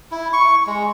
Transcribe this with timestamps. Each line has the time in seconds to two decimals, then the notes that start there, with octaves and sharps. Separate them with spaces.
0.11 E4
0.33 C#6
0.67 G#3